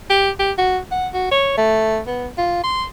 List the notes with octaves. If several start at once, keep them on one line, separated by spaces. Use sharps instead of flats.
G4
G4
F#4
F#5
F#4
C#5
A3
B3
F4
C6